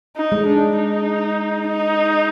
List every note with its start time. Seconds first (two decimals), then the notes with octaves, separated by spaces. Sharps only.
0.16 D#4
0.32 G#3
0.47 D4
0.77 D#4
1.68 D#4